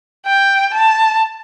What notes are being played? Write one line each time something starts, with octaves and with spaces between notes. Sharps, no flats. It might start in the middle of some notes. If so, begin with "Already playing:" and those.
G5
A5